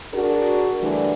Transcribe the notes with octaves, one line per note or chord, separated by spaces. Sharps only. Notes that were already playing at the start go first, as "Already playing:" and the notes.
D4 F#4 G#4 A#4
D3 E3 G3 A3 D4